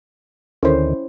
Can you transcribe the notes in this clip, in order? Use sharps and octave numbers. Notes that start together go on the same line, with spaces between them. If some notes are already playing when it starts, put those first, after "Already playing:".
D2 D3 D#3 C#4 E4 C5